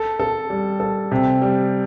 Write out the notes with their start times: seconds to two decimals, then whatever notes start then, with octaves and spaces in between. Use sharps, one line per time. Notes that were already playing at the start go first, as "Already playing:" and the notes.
Already playing: A4
0.20 A4
0.50 G3
0.80 A4
1.11 C3
1.42 G3